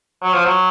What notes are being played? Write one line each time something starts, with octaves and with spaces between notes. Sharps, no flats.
F#3
F3
F#3